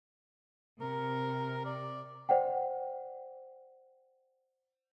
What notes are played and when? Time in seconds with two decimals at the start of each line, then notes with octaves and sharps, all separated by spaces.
0.81 C3 A#4
1.65 D5
2.29 C5 D5 F#5 G5